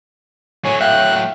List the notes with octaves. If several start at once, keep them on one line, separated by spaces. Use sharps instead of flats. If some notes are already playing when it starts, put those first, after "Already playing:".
A2 F#3 C#5 G#5
E5 F5 G5 F#6